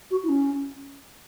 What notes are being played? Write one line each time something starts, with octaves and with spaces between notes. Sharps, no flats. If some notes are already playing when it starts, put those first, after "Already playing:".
F#4
E4
C#4